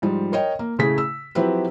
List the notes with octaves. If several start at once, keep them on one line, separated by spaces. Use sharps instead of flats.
G#2 F3 G3
A#4 C#5 D#5 G5
A#3
A2 C#3 A3 G#4 B6
E6
F3 F#3 C4 E4 G4 B4